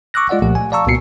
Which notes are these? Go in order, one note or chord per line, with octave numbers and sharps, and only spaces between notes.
C#6 D6 E6 F#6 A#6
G#3 F4 D5 D#5 F#5
C2 A#2 F3 A3 G4 F#5
G#5
D5 F5 A5 A#5 C#6 E6
C2 A#2 B3 F#4 C7 C#7